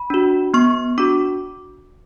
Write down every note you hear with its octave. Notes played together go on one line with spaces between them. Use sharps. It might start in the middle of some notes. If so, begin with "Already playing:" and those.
Already playing: B5
D4 F#4
B3 C#6
D4 F#4 D6